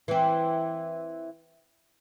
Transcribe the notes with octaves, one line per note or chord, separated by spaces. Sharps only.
E3 C4